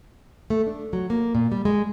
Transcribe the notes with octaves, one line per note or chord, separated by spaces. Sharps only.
A3
D4
F#3
A#3
A#2
G3
G#3